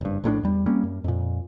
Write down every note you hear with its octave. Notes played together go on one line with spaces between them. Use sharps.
F#1 G2
A#1 A2 C3 D4
E2 G3
G3 A#3 C4 C#4
F#2
F2 A#2